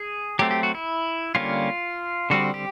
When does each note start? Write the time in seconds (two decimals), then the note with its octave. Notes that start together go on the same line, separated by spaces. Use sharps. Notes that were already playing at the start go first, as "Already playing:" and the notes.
Already playing: G#4
0.39 F#3 A3 C4 G4
0.51 G4
0.63 F#4
0.75 E4
1.35 D3 G3 A#3 C#4 F4
2.30 D3 G3 C4 F#4
2.54 G4